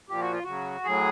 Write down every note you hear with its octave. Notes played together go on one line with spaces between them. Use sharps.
A#2 F3 G4
F#4
F4
C#3 F#3 F#4
A2 F#3 G#4